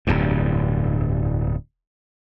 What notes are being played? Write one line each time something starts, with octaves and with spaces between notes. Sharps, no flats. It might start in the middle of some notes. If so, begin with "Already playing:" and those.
D1 E2 G2